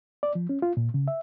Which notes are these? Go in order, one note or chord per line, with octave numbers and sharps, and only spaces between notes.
D5
F3
C#4
F4
A#2
C#3
E5